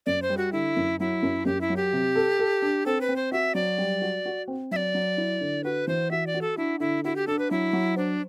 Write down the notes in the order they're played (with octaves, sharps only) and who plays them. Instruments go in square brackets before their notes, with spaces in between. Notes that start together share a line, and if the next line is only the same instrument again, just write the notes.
[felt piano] F#2 [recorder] D5
[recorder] C5
[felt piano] G3
[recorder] F#4
[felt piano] D3 [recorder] E4
[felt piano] F#2
[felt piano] F#3 [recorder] E4
[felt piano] F#2
[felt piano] F#2 [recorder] G4
[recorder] E4
[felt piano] F#3
[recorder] G4
[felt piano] C3
A4
A4
D4
[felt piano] C4 [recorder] A4
[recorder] B4
[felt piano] C4
[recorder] C5
[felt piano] F#4 [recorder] E5
[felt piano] F#3 [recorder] D5
[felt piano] G3
F#4
F#4
C4
[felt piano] F#3 [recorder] E5
[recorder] D5
[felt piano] F#3
E4
D3
[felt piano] F#4 [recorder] B4
[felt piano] E3 [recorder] C5
[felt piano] F#4 [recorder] E5
[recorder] D5
[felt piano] F#4
[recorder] A4
[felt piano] D4 [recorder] E4
[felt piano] D3 [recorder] E4
[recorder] E4 [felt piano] F#4
[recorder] G4
[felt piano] D4 [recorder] A4
[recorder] B4
[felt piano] F#3 [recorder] E4
[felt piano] F#3
[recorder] D4 [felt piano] C5